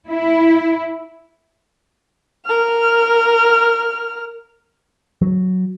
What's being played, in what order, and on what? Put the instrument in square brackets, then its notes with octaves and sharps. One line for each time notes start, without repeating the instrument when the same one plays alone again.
[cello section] E4
[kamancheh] A#4 F6
[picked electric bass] F#3